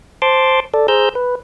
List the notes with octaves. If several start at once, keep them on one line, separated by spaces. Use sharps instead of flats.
C5 A5 C6 D6
A4 D5
G#4 C5 A#5 E6 G6
B4